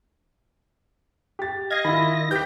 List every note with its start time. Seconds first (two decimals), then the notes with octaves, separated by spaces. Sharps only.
1.39 G4 A6
1.70 D#5 F5 G#6 A#6
1.85 D#3 E4 F4 B5 A#6
2.31 G4 B4 G6 B6